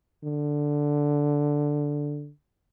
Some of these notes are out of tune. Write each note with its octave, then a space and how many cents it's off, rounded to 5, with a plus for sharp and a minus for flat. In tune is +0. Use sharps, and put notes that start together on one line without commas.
D3 +0